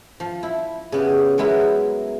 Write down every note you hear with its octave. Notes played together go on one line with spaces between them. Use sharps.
F3
E4
C#3 B3 G4
F#3 G#3 B3 E4 A#4